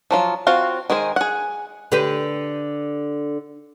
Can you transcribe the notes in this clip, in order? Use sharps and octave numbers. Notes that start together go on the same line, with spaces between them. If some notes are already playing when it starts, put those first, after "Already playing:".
F3 F#3 F4
C4 F4 F#4 F5
D#3 G#3 G#4 C5
G#4 F#5
D3 G4 B4